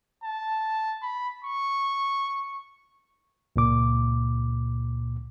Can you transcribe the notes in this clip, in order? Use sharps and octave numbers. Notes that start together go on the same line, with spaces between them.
A5
B5
C#6
C#2 A#2 D6